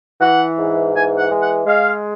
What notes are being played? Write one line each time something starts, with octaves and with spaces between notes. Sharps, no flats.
E3 F#5
G#2
E3 G#5
F#5
G#3
F#5
G#3 F5